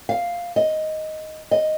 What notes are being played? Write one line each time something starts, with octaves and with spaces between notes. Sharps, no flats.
F5
D#5
D#5